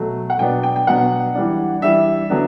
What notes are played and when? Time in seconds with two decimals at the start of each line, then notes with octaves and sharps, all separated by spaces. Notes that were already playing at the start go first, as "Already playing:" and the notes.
Already playing: B2 F#3 A3
0.30 F#5
0.39 B2 F#3 B3 D4 G5
0.63 G5
0.76 G5
0.87 B2 F#3 B3 D4 F#5
1.35 E3 G3 D4
1.82 E3 G3 D4 E5
2.30 D3 F#3 B3 D4